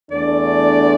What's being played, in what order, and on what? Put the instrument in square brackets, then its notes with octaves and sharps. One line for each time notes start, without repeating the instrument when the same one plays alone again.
[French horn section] E2 D3 A3 D4 [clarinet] D5